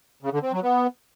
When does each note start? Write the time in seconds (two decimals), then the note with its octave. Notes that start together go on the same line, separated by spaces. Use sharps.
0.23 C#3
0.33 D3
0.43 C4
0.53 F#3
0.63 B3